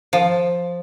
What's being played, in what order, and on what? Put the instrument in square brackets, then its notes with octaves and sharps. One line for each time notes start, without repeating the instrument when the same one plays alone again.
[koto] F3